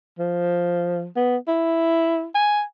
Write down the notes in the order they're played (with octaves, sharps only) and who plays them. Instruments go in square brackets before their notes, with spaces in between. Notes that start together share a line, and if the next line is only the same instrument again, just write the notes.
[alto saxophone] F3
B3
E4
G#5